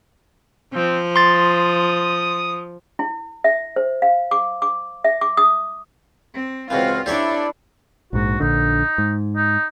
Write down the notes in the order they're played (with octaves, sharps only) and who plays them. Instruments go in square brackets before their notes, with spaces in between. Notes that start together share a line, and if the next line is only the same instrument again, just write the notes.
[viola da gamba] F3 [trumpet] C4
[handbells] C6 A6 [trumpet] D#6
[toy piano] E4
E5
C5
F5
D6
D6
E5
D6
D#6
[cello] C4
[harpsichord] C#2 E3 [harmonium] C4 F5 [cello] F4 F#4
[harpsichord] C4 G4 C#5 [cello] D4 A4 [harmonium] E4 D5
[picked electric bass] A#1 G#2 [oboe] F#4
[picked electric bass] A#1 D3 [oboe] D#4
[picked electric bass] G#2
[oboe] D#4